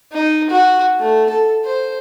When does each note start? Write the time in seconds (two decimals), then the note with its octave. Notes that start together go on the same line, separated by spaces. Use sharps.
0.12 D#4
0.50 F#4
0.99 A3
1.30 A4
1.65 C5